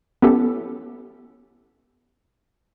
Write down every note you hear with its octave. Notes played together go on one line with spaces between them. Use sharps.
B3 C#4 E4 G4 A4